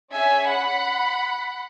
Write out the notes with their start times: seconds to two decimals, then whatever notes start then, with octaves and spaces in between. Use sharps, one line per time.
0.12 C#4 G#4 E5 G#5
0.47 F#5 B5